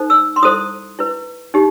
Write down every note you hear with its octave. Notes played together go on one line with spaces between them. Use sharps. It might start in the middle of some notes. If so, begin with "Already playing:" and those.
Already playing: D#4 A4 C5
E6
C6
E4 A4 C5 D#6
E4 B4
D#4 G4